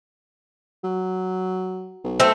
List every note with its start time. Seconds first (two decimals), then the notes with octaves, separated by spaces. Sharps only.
0.84 F#3
2.04 B1
2.20 A3 C4